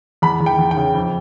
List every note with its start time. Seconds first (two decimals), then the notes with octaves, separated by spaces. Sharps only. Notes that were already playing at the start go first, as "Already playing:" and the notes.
0.22 E2 B5
0.40 E2
0.46 G5
0.59 E2
0.71 G5
0.77 C#3
0.95 F2